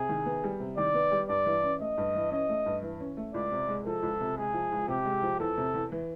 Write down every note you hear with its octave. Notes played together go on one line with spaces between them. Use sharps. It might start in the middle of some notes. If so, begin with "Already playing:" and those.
Already playing: C3 G#4
D#3
B3
G3
C3
D#3 D5
B3
G3
G2 D5
E3
C#4
A3 D#5
G2
E3
C#4 D#5
A3
G2
E3
C#4
A3
C#2 D5
C3
G#3
F3 A4
C#2
C3
G#3 G#4
F3
C#2
C3 G4
G#3
F3
E2 A4
C3
E2
E3